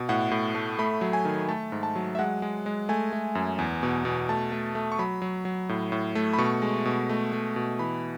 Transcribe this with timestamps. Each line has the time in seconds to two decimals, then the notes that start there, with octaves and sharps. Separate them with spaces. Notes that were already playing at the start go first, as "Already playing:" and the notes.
Already playing: B2
0.09 A2 F#5
0.31 A2
0.55 A3
0.79 A3 B5
1.01 F#3
1.13 G#5
1.25 D#3
1.49 A3 A5
1.72 G#2
1.83 A5
1.96 F#3
2.15 E5
2.19 G#3 F#5
2.42 G#3
2.66 G#3
2.89 A3 G#5
3.13 A3
3.35 F#2
3.59 E2
3.83 B2
4.05 B2
4.29 A3 A5
4.52 A3
4.75 A3
4.92 C#6
4.99 F#3 B5
5.22 F#3
5.45 F#3
5.69 A2
5.92 A2
6.15 A3
6.33 B5
6.38 B2 C#6
6.62 G#3
6.85 B2
7.09 A3
7.33 A3
7.56 B2
7.79 E3 B5